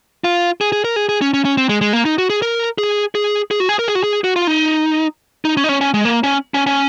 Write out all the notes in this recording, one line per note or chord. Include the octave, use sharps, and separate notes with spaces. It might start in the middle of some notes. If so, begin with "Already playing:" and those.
F4
G#4
G#4
A#4
G#4
G#4
C#4
C#4
C#4
C4
G#3
G#3
A#3
D#4
F#4
G#4
A#4
G#4
G#4
G#4
F#4
G#4
A#4
G#4
F#4
G#4
F#4
F4
D#4
D#4
C#4
D#4
C#4
C#4
G#3
A#3
C#4
C#4
C#4